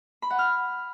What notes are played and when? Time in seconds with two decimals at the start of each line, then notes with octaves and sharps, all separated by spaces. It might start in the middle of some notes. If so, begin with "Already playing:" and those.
0.22 B5
0.30 F#5
0.39 F6